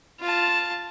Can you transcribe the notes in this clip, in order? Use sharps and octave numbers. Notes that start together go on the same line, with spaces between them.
F4 A5